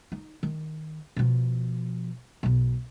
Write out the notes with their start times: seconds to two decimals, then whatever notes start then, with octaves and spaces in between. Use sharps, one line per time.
0.12 D#4
0.43 D#3
1.16 B2 F3
2.43 B1 B2